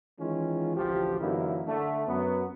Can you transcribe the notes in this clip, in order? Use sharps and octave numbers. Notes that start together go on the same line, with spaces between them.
D#3 E3 G#3 C#4 F4
A1 D2 F3 G4
F#2 D3 E3 A#3 D#4 E4
D3 A3
F#2 F#3 B3